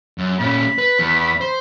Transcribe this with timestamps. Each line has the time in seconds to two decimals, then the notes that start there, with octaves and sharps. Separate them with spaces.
0.18 F#2
0.40 A#2 C#4 B5
0.78 B4
0.99 E2
1.41 C5